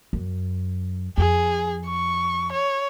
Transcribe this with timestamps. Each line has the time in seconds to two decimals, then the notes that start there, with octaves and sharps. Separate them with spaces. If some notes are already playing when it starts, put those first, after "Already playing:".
0.13 F#2
1.18 F2 G#4
1.87 C#6
2.53 C#5